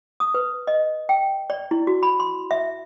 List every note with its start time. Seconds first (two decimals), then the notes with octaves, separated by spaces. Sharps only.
0.20 D#6
0.34 B4
0.67 D#5
1.09 G5
1.50 D5
1.71 E4
1.87 F#4
2.03 B5
2.20 C6
2.51 E5